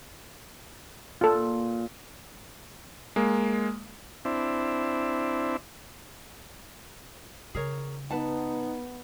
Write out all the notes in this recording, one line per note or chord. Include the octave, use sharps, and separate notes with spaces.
A#2 F4 A4
G#3 A#3
C4 D4 E4
C#3 G#4 A#4 C#5
B3 D#4 B4 F#5 A5